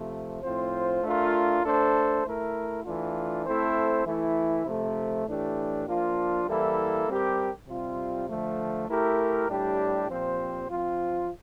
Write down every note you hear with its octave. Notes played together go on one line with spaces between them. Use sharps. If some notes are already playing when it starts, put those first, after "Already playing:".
Already playing: C3 F3 A3
A2 F3 C4 F4 C5
A3 D4 F4 A#4
A3 D4 A4 C5
A3 E4 A#4
E3 A3 D4 F4
A3 C4 E4 A4 C5
E3 A3 E4
C3 F3 A3
A2 E3 A3 D4 G4
F3 A#3 D4 F4
E3 G3 A#3 E4 A4
G3 C4 G4 A#4
C3 G3 C4 F4
D3 F3 A3
A3 E4 G4 A#4
A2 G3 D4 G4
A#2 F3 C4 G4 C5
F3 C4 F4